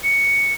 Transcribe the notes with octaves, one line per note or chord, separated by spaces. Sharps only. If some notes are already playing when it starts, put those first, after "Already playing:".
C#7